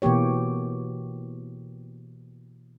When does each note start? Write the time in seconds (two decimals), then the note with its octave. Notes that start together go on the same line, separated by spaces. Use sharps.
0.02 B2 E3 A#3 G4 C#5